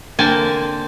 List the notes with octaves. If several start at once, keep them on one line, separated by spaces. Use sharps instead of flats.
D3 A#3 C4 G#5 A5